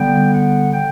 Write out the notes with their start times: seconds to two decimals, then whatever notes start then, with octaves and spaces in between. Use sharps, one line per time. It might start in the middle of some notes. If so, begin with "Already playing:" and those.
Already playing: D3 G3 B3 G5
0.33 F#5
0.73 D3 G5